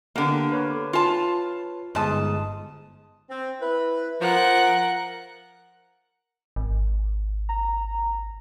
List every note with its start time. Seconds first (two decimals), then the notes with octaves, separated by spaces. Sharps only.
0.16 D3 A#3 B3 G4 F#5
0.52 B4 C#5
0.93 F4 A5
1.95 G1 G#2 G#3 A5 D#6
3.30 C4
3.61 E4 B4
4.20 F3 A#4 F#5 F#6
6.56 G#1
7.49 A#5